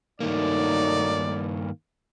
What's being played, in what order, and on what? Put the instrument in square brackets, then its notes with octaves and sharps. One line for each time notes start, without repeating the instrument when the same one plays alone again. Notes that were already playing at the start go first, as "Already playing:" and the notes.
[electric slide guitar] G2 D#3 A#3 [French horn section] F#3 A3 D#4 [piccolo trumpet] D5